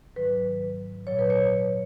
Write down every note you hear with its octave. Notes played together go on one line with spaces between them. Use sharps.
G#2 D#3 F#3 B4
A#2 F#3 C#5
B4
C#5